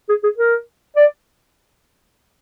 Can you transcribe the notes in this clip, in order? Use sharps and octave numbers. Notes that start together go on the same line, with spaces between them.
G#4
G#4
A#4
D5